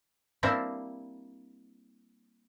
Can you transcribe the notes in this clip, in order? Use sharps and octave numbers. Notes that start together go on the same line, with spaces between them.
G3 A#3 C4 D4 E4